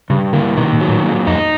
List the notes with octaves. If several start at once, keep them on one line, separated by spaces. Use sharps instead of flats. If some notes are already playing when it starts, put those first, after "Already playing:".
G2 C#3
D3 A#3
B2 D#3
A#2
F#3
A2
A#2
F2 D#4